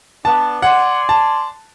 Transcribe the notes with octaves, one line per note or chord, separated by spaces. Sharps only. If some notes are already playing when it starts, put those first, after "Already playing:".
B3 D4 A5
D5 F#5 G#5 C6
A5